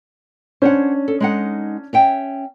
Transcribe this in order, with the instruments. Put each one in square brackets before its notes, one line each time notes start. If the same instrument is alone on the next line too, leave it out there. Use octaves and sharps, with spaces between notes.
[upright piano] C#4 D4 [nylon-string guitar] C5 C#5 F#5
[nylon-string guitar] A4
G#3 D#4 F#5
C#4 E5 G5